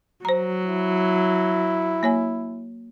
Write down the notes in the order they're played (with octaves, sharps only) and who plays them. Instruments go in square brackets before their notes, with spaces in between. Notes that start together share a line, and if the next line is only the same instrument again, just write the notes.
[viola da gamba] F#3 [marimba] C5 A#5
[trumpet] E4
[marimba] A#3 C#5 G#5